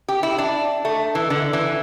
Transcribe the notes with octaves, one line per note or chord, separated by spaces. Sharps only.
G4
E4
D4
A3
E3
D3
E3